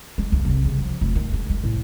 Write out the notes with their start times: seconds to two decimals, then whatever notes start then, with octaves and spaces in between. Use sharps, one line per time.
0.18 G#3
0.32 C#2
0.45 C2
0.65 C#3
0.78 F3
1.01 F1
1.15 D#3
1.33 C#2
1.50 G#3
1.64 A2